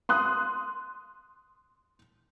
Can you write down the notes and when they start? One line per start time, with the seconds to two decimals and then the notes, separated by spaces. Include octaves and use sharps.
0.09 C6 D#6 F#6